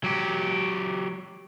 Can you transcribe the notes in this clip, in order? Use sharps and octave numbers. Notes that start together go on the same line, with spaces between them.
F#3 G4